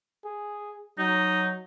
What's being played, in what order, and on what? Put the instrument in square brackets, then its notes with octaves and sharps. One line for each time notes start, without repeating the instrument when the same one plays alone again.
[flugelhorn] G#4
[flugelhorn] F#3 [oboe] D#4